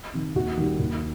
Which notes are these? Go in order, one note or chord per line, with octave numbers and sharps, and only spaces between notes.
C3 D#3
D#2 F#4
D#3 G3
D#2